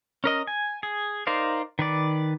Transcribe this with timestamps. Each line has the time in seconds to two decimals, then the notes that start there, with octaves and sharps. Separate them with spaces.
0.24 C#4 A#4 D#5
0.47 G#5
0.83 G#4
1.27 D#4 A#4 C5 D5 F5
1.79 D#3 B4 D5